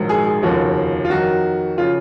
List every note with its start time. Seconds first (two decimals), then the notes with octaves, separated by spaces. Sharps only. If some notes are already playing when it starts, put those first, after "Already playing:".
Already playing: A#1 G#2 D#3 F#3
0.09 G#4
0.27 G#4
0.43 F1 D#2 C#3 F3 F#4
1.05 F4
1.10 F2 D#3 F#3 F#4
1.78 C#3 F3 F4